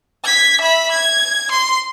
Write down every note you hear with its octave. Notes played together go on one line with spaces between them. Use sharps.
G#6 B6
E5 B5
G#6
C6